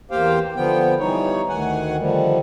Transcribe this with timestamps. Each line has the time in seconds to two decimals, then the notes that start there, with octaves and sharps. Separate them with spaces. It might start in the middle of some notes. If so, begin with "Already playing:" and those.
0.11 E2 A#3 G4 C5 F5 G5
0.56 D3 F3 B3 G5
1.00 E3 G3 D#4 C#5
1.49 D2 D#3 F#5 G#5
1.99 D3 D#3 F3 G3